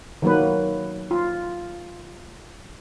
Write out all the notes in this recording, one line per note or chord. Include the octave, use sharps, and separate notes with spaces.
D#3 F#3 A#3 B4
F4